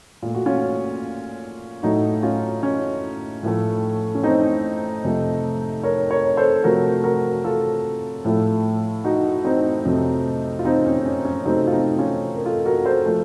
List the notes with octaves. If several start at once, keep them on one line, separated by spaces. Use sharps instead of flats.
A#2 A3 F4
F#4
C#4 F4
A2 F#3 A3 D#4 F#4
C#4 F4
C#4
A2 F3 A3
C#4
C4 D#4
F2 C3 F3 A3
A#4 C#5
A#4 C#5
A4 C5
C3 F3 A3 F#4 A#4
F#4 A#4
F4 A4
A2 F3 A3
D#4 F#4
C4 D#4
F2 C3 F#3 A3
F4
C4 D#4
C#4
C#4
C#4
C3 F#3 A3 C4 D#4
F4
C4 D#4
C#4 F4
A#4
F4 A4
F#4 A#4
A4 C5
F3 A3